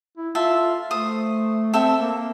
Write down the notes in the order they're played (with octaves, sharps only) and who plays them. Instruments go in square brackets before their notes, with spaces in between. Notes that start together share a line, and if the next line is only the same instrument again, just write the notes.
[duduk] E4
[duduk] F4 [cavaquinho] A4 E5 F5
[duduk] A3 [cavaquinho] C5 D#6
[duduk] C4 [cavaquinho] A4 E5 G5
[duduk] A#3